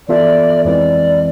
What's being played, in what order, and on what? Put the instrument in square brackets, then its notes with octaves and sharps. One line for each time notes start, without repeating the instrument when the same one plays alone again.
[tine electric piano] E3 B3 F4 A4 E5 [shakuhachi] D5
[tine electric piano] F2 E3 G#3 C4 [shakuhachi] D5